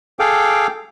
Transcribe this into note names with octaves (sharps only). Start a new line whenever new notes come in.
G#4 A4 F5 G5 D6